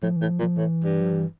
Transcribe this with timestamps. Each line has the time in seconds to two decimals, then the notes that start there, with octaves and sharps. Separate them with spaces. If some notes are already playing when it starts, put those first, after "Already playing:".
0.03 A2 F3
0.16 A2 E3
0.30 F3
0.39 A#2
0.43 F3
0.57 A2 E3
0.84 G2
1.00 F3
1.12 E3